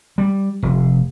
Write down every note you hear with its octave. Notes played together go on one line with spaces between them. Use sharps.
G3
F1